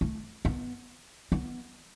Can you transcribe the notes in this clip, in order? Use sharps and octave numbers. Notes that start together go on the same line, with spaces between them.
A3
B3
B3